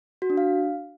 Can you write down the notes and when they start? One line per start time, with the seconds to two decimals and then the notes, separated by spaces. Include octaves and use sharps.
0.22 F#4
0.30 D4
0.37 F5